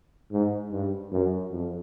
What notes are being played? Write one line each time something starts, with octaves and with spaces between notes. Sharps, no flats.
G#2
G2
F#2
F2